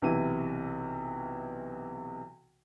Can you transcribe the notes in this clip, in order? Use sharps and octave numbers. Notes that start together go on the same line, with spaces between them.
B1 C3 E3 E4 D#7